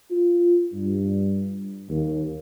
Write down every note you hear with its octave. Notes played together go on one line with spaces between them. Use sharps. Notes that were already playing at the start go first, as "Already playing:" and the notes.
F4
G2
D#2